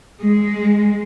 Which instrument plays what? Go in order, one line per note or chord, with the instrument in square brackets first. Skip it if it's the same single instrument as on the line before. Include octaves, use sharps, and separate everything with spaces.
[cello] G#3